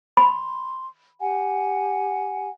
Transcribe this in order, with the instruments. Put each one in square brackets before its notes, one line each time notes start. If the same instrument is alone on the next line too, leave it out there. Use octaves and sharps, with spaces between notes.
[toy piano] B5 [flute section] C6
[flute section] G4 F#5 G#5